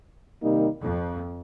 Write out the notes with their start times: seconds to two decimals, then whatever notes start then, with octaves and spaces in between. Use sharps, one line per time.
0.42 C3 D#3 G3 A#3 D#4
0.80 F2